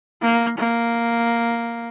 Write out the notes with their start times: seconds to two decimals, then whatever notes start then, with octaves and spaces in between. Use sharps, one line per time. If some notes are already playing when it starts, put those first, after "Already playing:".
0.22 A#3
0.58 A#3